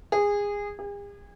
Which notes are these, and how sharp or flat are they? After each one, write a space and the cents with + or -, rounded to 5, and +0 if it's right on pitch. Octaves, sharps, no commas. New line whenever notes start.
G#4 -20
G#4 -45